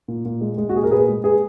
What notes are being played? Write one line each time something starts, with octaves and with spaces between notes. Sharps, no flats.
A#2
A#2
G#3
G#3
F#4
A#2 G#4
A#4
A#2 G#4 B4
G#3
G#3 G#4 B4